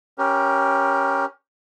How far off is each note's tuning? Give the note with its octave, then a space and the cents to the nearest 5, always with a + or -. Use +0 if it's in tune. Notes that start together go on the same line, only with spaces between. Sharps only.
C#4 +0 G4 +0 A#4 +20